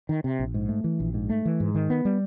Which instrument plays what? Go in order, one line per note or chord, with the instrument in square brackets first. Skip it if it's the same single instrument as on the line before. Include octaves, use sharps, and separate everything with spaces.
[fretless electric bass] D#3
C3
A#1
G#2
A3
E3
A#1
G#2
A3
E3
G#2
D#3
B3
G3